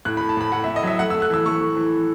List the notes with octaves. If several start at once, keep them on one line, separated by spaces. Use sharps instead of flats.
A2 F#6
B5
A2
A5
A2 B5
A2 F#5
E5
A2
D#5
F#3 E5
A3 F#5
E6
A3
F#6
E3 E6
A3 C#6
A3
E3